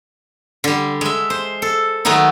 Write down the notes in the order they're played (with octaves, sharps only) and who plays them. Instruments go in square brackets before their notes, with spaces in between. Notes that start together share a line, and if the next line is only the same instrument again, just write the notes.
[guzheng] D3 G3
G#3 E5
C5
A4
D#3 F#3 G#3 A3 B3 D#4